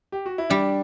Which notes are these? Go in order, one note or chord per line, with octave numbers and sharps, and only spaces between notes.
G4
F#4
E4
G3 D4